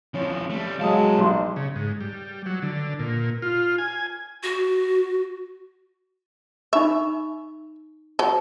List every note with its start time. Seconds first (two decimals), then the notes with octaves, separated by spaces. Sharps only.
0.14 E2 F3 C#4
0.50 G3 A3
0.79 E2 F#3 G#3 F5 A5 D#6
1.18 B1 G3 C6
1.56 C#3
1.76 G#2
2.01 G3
2.46 F#3
2.62 D3
2.99 A#2
3.42 F4
3.78 G#5
4.43 F#4
6.73 D#4 E5 B5 C#6
8.19 F#3 C5 A5